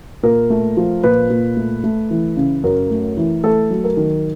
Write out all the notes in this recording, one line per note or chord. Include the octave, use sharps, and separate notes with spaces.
A#2 A#4
A3
F3
A#2 B4
A#2
A3
A3
E3
C#3
F#2 A#4
A3
E3
A3 A4
F#3
A#4
D#3